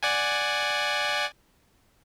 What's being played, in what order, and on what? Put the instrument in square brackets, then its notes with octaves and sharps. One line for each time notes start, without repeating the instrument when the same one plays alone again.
[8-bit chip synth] D5 F#5 G#5